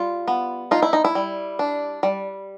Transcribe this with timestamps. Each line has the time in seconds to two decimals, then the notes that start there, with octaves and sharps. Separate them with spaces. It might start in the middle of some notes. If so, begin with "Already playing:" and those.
Already playing: G3 F4
0.28 B3
0.71 D#4 F4
0.82 E4
0.93 D#4
1.05 E4
1.15 G3
1.59 D4
2.03 G3